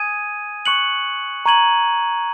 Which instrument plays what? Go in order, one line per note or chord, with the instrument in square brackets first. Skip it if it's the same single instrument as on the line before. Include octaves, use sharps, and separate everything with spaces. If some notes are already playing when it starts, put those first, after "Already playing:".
Already playing: [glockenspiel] G#5 D#6 G#6 D#7
C#6 F#6 C#7 F#7
A#5 C#6 G#6 D#7 F#7